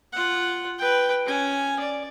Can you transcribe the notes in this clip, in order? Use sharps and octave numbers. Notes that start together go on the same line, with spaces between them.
F4 F#5
B4 G5
C#4 G#5
D5